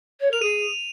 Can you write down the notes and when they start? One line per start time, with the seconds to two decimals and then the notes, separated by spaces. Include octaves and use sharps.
0.20 C#5
0.30 A#4 F7
0.42 G#4 D#7